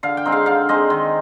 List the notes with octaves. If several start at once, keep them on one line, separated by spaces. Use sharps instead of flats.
D3 F5
G5
G#3 C4 D#4
F5
D3 F5
G#3 C4 D#4 D#5
D#3